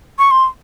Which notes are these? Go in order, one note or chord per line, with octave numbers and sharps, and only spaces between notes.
C#6
C6